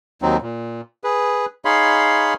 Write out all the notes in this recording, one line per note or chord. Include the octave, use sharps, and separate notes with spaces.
D#2 F#3 C4 D#4
A#2
G#4 B4
D#4 G#4 C#5 F5 B5 C6